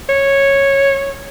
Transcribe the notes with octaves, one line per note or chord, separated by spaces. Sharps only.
C#5